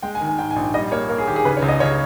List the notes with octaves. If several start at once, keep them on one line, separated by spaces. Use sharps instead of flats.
G#3 G5
G#5
D#3
G#5
G#2 G5
G#5
A#1
G5
G3 D#5
A#3 C#5
A#3 A#4
G#4
D#3 G4
G#4
C#3 B4
C#5
C#2
D#5
C#3 C#5